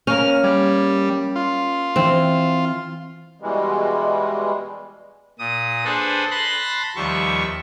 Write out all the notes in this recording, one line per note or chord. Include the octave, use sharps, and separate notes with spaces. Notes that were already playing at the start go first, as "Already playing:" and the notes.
A#3 C#4 F6
G3 G#6
F4
E3 C4 E4
B2 E3 G3 G#3
A#2 D#6
D4 G#4 A4 B4 C5
A5 B5 C6 F#6 A#6
D#2 F3 G3 E5 C#6